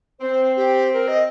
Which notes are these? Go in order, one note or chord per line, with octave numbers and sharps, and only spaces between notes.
C4 C5
G4
A#4
D#5